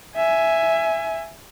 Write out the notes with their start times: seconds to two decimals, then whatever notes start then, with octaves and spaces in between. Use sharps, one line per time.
0.17 E5 G#5